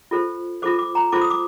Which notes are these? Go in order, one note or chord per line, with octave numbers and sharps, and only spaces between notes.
F4 A4 C5
F4 A4 C5 D6
D6
A#5
F4 A4 C5 D6
D#6
D6